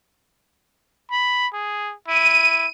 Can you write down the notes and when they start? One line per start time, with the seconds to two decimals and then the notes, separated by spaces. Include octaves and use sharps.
1.11 B5
1.53 G#4
2.08 E4 D#7